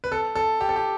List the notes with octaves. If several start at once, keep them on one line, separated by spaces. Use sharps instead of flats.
B4
A4
A4
G4
A4
G4